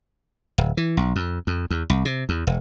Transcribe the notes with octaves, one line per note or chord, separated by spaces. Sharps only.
D1
E3
B1
F2
F2
E2
C2
C3
E2
E1